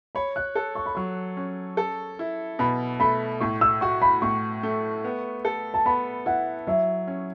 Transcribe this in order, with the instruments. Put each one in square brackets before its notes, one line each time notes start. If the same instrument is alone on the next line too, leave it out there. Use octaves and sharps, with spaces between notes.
[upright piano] C#5 [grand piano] B5
[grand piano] F#6
[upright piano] A4
[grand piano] C#6
B5
[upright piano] F#3 [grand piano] C#6
[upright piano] C#4
A4
E4
[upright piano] B2 [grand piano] B5
[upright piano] A3 [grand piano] B5
[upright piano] A2 [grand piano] C#6
[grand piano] E6
[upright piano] F#4 [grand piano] C#6
[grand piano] B5
[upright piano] A2 [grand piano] C#6
[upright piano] A3
B3
A4
[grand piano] A5
[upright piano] B3 [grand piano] B5
[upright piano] E4 [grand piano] F#5
[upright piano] F#3 [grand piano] E5
[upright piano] C#4